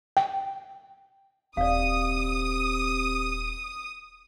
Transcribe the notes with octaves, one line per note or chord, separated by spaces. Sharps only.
G5
D#1 C3 D5 F5 D#6